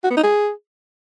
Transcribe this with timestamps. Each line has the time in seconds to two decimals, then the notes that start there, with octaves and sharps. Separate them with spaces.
0.04 F#4
0.11 B3
0.17 D#4
0.23 G#4